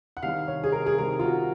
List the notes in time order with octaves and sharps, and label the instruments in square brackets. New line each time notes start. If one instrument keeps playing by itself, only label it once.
[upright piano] F#5
C2 C3 D#3 F5
C#5
G#4
A#4
G#4
C2 C3 D#3 A#4
F4
F#4